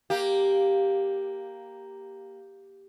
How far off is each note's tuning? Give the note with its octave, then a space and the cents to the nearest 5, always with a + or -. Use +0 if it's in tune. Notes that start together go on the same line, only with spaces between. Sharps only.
A#3 +0 G4 +0